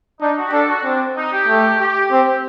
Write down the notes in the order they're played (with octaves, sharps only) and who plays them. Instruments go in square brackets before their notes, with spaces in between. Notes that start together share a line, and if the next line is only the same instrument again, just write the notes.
[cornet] D4 [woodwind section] D#4
[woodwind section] F#4
G4
[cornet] D4 [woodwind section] A4
[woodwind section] F#4
[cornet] C4 [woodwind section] D4
[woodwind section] D#4
G4
[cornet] A3
[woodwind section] G4
[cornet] C4